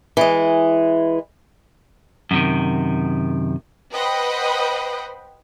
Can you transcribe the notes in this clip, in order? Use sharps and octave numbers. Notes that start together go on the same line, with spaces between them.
E3 G#3
F#2 C3 D#3
B4 C5 D#5 F#5 G5 B5